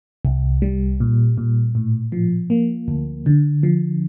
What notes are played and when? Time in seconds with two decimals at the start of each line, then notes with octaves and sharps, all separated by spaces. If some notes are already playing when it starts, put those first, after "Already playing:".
0.25 C2
0.62 G3
1.00 A#2
1.38 A#2
1.75 A2
2.12 F3
2.50 A#3
2.88 D2
3.26 D3
3.63 F3